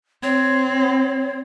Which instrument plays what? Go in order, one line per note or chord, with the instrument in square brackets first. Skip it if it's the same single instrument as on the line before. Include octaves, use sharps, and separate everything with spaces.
[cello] C4 [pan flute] C#5